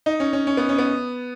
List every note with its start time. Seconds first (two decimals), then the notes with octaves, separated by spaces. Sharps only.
0.06 D#4
0.20 C#4
0.33 C#4
0.47 C#4
0.57 B3
0.69 C#4
0.78 B3